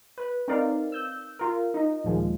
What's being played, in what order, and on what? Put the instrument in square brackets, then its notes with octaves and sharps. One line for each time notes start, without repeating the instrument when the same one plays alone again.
[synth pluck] B4
C4 D#4 A#4 D5 F5
E6 G6
F4 A#4
D#4 D#5
D#2 A#2 F3 G#3